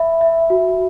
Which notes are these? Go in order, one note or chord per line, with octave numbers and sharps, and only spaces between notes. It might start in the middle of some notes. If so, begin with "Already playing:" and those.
Already playing: E5 B5
E5
F#4